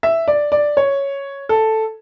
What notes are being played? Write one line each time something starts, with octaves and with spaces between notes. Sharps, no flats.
E5
D5
D5
C#5
A4